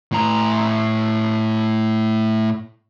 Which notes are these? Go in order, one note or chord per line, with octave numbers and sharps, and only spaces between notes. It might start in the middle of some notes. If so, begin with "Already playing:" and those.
A2 A#5